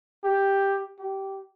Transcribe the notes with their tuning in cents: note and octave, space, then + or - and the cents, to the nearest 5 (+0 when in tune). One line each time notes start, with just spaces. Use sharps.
G4 +5
G4 -15